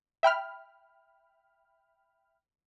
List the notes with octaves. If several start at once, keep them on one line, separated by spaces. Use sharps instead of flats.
E5 G5 B5 F6